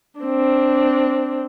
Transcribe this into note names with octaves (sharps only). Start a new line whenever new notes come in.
C4 D4